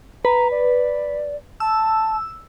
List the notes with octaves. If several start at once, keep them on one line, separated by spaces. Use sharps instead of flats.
B4 A#5
D5
A5 E6